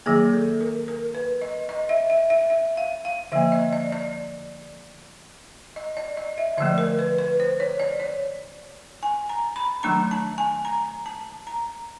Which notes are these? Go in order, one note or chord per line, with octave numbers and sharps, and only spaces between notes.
D#3 F#3 A#3 G#4
A4
A#4
A#4
B4
D#5
D#5
E5
E5
E5
E5
F5
F5
D3 F3 A#3 E5
D#5
D5
D5
D#5
D5
D#5
E5
D3 F3 A3 D5
A#4
B4
B4
C5
C#5
D5
C#5
G#5
A#5
B5
D#3 F#3 A3 D4 A#5
A5
G#5
A#5
A5
A#5